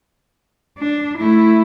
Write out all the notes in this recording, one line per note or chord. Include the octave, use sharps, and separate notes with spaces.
D4
A3 E4